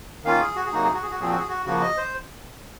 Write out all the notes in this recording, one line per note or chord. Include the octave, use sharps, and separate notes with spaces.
D#3 A#3 C#4 F4 F5
G#4
F#4
G#4
C3 F#3 A#3 D#4 F#4
G#4
F#4
G#4
F#4
A#2 F3 C4 G#4
F#4
G#4
F#4
C#3 F3 A#3 F#4
D#5
C5